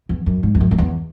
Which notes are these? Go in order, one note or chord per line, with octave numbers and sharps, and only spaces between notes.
E2
F#2
G#2
E2
F#2
F#2
E2